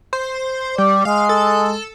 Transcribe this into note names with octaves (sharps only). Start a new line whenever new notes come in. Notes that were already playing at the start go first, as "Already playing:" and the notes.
C5
G3 D5
G#3 F5
A4